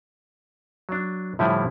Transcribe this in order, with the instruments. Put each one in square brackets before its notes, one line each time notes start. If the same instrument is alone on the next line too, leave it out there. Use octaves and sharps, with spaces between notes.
[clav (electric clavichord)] F#3 D4
A2 D3 F3 G3 E4 G#5